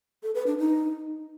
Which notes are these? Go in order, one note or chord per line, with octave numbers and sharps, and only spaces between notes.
A4
B4
D4
D#4